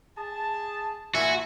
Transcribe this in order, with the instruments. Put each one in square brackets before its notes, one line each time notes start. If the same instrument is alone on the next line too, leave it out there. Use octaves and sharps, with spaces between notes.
[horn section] G#4 A5
[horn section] A#2 G#5 [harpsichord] E4 [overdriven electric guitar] F#4